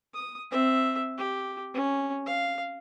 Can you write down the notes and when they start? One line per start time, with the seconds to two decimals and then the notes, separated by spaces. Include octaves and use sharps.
0.14 D#6
0.51 C4 E5
1.18 G4
1.74 C#4
2.27 F5